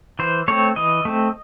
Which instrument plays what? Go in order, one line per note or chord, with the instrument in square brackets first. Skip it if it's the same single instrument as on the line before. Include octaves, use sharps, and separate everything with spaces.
[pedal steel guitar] E3 C5
A3 C4 C#5
E3 D#5
A3 C4